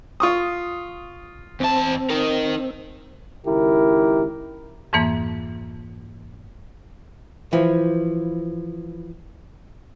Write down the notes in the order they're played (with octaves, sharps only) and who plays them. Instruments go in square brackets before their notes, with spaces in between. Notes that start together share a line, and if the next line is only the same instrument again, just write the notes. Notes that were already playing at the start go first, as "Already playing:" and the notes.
[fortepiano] F4 C#6 D#6
[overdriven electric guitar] E2 A5 [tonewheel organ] C4
[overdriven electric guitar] D#4 A#4
[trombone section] C#2 D#3 E4 G4 A#4
[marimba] F2 G#2 E3 A#3
[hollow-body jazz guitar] E3 F3